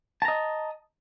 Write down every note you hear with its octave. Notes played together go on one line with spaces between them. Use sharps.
D#5 A5 A#5